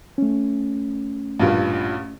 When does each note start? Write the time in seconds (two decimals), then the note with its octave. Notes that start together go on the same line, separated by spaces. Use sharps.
0.18 A3 C#4
1.40 A1 G2 A#2